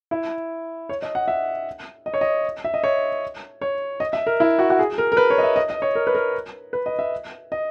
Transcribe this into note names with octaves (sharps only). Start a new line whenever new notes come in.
E4
C#5
D#5
F#5
E5
D#5
C#5
D#5
E5
D#5
C#5
C#5
D#5
E5
A#4
E4
F#4
F#4
G#4
A#4
A#4
B4
C#5
D#5
E5
D#5
D#5
C#5
A#4
B4
A#4
B4
D#5
E5
D#5